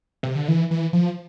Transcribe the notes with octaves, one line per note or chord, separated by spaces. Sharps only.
C3
D3
E3
E3
F3